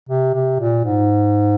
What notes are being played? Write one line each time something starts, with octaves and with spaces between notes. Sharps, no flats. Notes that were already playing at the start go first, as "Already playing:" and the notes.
C3
C3
A#2
G#2